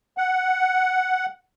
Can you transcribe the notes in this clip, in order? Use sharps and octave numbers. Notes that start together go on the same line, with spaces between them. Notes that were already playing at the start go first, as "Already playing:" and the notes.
F#5